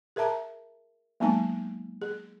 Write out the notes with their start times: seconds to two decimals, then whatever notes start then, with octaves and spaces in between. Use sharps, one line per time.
0.16 G#4 A#4 E5 A5 A#5
1.20 F#3 G#3 A#3 B3 D#4 G#5
2.02 G#4